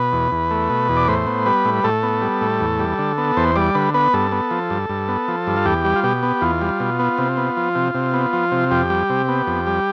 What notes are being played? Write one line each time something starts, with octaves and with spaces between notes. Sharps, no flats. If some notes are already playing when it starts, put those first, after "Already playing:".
Already playing: B2 B4
E2
E2
A3
B2
E2
D5
A2 C5
B3
G3 B4
A2
A2 A4
B3
G3
A2
E2
G3
D3
B3
E2 C5
G3 D5
D3 B4
B3 B4
G2 A4
B3
F3
G2
G2
B3
F3
G2
F4
E2 G4
G3
F4
B2 G4
B3
E2 F4
G3
B2
B3
C3
B3
F3
C3
C3
B3
F3
C3
F2 G4
G3
C3
B3
F2
G3